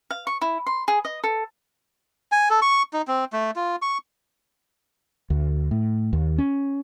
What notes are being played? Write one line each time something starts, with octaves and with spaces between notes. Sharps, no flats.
F5
C#6
E4
C6
G#4
D#5
A4
G#5
A4
C#6
D#4
C4
A3
F4
C#6
D2
A2
D#2
C#4